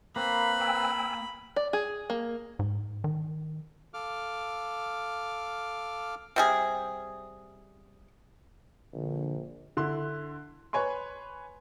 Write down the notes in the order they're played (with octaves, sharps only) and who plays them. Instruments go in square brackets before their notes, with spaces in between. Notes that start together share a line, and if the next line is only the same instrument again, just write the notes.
[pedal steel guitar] A#3 [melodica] C4 B4 [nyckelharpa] B5
[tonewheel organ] G5 G#5 E6
[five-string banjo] D5
G#4
A#3
[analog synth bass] G#2
D#3
[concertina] A4 F5 D6 F6
[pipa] C3 G3 G#4
[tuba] A#1 [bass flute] D3
[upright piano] D3 E4 C6
B4 C#5 G#5 B5 C6